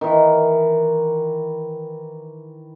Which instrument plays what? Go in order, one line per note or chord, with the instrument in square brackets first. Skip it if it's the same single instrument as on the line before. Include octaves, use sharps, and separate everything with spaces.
[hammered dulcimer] D#3 E3